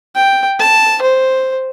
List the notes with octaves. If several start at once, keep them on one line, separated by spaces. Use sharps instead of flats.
G5
A5
C5